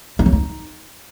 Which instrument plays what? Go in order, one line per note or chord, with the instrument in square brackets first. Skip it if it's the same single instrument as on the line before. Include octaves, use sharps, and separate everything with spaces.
[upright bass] D#4
F#3
D#4